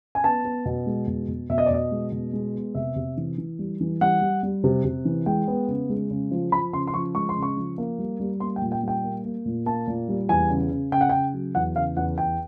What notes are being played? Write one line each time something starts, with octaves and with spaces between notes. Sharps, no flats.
G#5
B3 A5
B3
B2
G#3
B2
B2
B2 E5
D#5
D5
B2 D#5
G#3
B2
G#3
B3
C3 E5
C3
E3
E3
G3
E3
G3 F#5
G3
G3
C3
C3
E3
G#3 G5
B3
C#3
G#3
C#3
F3
F3 B5
C#3 C6
C6
F3 C#6
G#3 C#6
C6
C#3
C#6
F3
A#3
G3
G3
A#3 C6
G5
A#2
G5
G3 G5
A#3
A#3
A#2
A#3 A5
A#2
G3
E2 G#5
C#3
C#3
C#3 G5
F#5
C#3 G5
F#3
E2 F#5
C#3 F5
E2 F#5
E2 G5